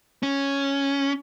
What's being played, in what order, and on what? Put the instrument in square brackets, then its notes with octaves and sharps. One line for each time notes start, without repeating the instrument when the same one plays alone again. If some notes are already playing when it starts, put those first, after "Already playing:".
[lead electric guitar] C#4